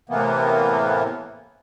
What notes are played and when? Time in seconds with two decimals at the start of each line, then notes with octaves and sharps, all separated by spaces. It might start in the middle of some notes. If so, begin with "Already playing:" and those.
0.09 A2 C3 E3 A#3 B3